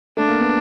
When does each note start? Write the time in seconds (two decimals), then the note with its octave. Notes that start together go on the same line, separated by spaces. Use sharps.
0.17 A3 D4
0.28 A#3
0.40 B3